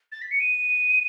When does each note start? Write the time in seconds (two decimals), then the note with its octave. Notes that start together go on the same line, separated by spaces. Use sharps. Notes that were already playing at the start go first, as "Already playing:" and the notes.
0.12 A6
0.22 B6
0.31 C#7
0.40 D#7